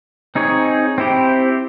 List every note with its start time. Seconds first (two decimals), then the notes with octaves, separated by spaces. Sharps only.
0.35 C4 D#4 G#4 C#5
0.98 C4 E4 G4